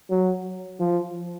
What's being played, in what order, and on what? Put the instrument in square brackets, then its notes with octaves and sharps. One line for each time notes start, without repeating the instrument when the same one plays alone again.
[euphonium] F#3
F3